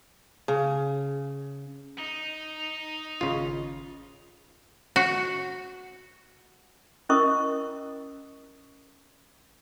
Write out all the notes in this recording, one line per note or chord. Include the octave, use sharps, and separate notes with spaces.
C#3
D#4
G#1 C#3 F4
F#4
C#4 E4 A#4 D#5 C#6 D#6